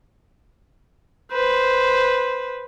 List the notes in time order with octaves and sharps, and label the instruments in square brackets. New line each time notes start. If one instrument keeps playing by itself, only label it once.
[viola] B4 C5